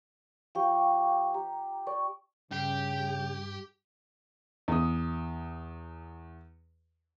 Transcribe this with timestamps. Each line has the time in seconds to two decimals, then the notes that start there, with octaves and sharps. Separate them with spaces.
0.55 F3 G4 F5 G5 C#6
1.34 G4 A#5
1.87 D5 G5 C#6
2.52 G2 C#3 G4 G5
4.68 E2 D#6